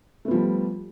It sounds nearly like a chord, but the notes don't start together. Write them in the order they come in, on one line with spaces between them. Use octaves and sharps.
A3 B3 F3 G3